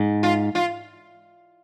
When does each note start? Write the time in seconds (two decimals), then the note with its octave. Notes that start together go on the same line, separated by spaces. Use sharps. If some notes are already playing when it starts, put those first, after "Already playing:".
Already playing: G#2
0.23 F4
0.55 F4